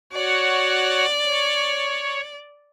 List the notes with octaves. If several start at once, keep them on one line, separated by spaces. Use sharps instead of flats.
F#4 C#5 D5 F#5
C#5